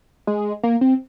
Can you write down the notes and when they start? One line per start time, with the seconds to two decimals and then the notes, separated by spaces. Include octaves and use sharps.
0.27 G#3
0.63 A#3
0.81 C4